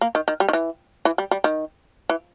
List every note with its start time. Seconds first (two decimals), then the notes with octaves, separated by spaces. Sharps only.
0.01 A#3
0.15 D#3
0.28 D#3
0.40 G3
0.48 D#3
0.53 E3
1.05 E3
1.18 G3
1.31 G3
1.44 D#3
2.09 E3